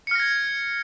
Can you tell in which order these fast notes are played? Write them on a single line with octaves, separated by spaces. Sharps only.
C#7 F6 A#6 G#6